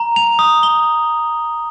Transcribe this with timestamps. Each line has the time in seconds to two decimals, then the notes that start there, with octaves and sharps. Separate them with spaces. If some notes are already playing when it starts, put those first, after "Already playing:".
Already playing: A#5
0.16 F7
0.39 D#6
0.63 G7